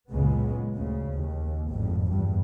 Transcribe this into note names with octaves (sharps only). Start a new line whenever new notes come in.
F#1 C#2 A#2 C#3 G#3 B3
D2 C#3
D#2
G#1 F2 A2
E2 G2 A#2